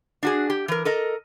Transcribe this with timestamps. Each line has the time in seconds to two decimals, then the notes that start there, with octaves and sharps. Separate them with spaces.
0.23 D4 F#4 G#4
0.50 G4
0.68 E3 A#4
0.85 A4 A#4 D#5